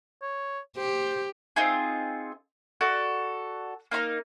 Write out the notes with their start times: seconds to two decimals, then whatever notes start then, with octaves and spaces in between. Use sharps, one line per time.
0.22 C#5
0.77 G4 C5
1.56 C4 D#4 F4 G#4
2.81 F#4 A4 D5
3.91 A#3 D#4 B5 F6